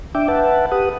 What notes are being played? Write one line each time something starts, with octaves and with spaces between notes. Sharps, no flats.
D4 E5 G5 D6
B4 E5 F#5 A5
G4 B4 F#5 D#6